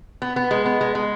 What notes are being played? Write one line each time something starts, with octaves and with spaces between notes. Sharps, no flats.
B3
B3
G#3
B3
G#3
G#3